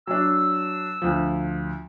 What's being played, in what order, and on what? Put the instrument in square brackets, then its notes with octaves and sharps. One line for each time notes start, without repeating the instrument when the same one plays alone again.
[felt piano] F#3 D4 [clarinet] E6
[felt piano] D2 F3